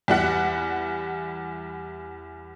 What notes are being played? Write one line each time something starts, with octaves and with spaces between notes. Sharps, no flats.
E2 G3 F#5 B6